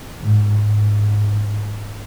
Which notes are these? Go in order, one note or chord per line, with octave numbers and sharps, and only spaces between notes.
G#2
G#2